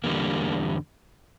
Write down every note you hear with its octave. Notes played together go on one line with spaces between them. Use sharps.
E2 D3 G3 A#3